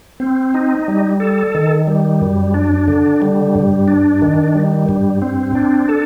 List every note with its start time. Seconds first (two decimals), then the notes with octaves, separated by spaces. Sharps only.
0.20 C4
0.54 D#4
0.88 G3
1.20 A4
1.55 D#3
1.87 G3
2.21 F#2
2.54 D4
2.88 D3
3.22 G3
3.55 G2
3.88 D4
4.22 D#3
4.55 G3
4.89 G2
5.22 C4
5.55 D4
5.89 A4